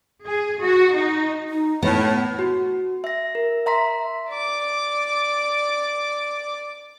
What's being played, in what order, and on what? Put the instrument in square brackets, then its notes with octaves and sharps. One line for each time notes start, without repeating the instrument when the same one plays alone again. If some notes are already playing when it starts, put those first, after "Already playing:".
[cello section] G#4
F#4
D#4
[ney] D#4
[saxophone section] A2 [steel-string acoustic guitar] B3 [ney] C#5
[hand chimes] F#4
E5 A#6
A#4
E5 A#5 C6 B6
[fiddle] D5 D6